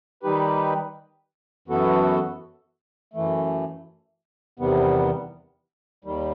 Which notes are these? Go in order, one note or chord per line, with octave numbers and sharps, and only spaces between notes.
D#3 G3 D#4 G4 B4
F#2 E3 B3 F#4 A4
F#2 E3 A3
E2 C3 D#3 G3 B3
D#2 D#3 G3